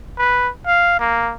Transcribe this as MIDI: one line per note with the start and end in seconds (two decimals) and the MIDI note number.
0.18 0.50 71
0.67 0.96 77
1.00 1.34 58